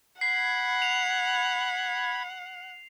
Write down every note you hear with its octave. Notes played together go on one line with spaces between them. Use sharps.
F#5 B5 G#6 C7
F7